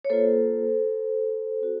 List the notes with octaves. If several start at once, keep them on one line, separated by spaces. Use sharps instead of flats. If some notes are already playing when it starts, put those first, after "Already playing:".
C#5
A#3 F4 A4 C5
C4 F#4